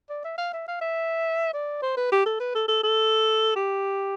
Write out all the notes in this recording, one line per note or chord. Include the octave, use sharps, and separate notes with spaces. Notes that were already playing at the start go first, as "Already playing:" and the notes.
D5
E5
F5
E5
F5
E5
D5
C5
B4
G4
A4
B4
A4
A4
A4
G4